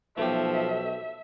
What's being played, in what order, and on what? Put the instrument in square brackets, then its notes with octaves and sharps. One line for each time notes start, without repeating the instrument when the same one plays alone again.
[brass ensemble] B1 [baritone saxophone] F3 [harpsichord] A3 G4 [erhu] E5